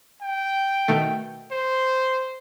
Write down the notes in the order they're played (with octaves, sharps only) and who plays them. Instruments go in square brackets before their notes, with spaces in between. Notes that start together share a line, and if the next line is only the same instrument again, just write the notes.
[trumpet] G5
[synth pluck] B2 D#3 A3
[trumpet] C5